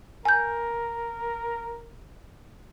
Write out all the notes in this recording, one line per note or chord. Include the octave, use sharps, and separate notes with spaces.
A#4 G#5 G6